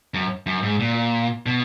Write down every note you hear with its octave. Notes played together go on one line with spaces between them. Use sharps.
F#2
F#2
G#2
A#2
B2